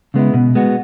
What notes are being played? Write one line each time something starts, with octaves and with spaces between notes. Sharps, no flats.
C#3 G#3 B3 E4
B2
G#3 B3 F#4